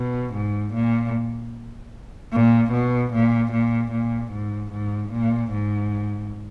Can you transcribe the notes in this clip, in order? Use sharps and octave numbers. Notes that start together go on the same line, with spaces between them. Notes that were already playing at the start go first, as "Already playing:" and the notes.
Already playing: B2
G#2
A#2
A#2
B2
A#2
A#2
A#2
G#2
G#2
A#2
G#2